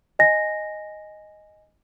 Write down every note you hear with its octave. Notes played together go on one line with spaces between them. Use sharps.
D#5 G#5 A#6